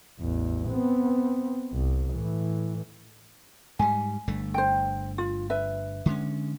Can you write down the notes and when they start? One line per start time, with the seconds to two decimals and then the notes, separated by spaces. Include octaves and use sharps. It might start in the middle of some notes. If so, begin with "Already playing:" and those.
0.19 A1 E2
0.69 B3 C4
1.73 C2
2.14 A2 E3
3.79 G#2 G3 G#5
4.28 G1 G2 A3
4.54 C5 G5
5.18 F4
5.50 B4 E5
6.06 D3 G#3 C#4